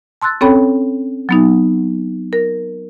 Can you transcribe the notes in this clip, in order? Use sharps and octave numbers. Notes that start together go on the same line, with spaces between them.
A5 C6 E6 F#6 A6
C4 C#4 A4 C#5 G5 B5
F#3 B3 D#4
A#4